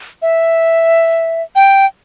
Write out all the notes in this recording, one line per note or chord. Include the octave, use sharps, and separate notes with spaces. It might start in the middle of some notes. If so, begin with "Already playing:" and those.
E5
G5